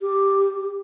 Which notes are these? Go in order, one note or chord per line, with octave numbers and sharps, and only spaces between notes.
G4